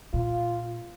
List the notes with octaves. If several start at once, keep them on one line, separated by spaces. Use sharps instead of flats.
A#2 F4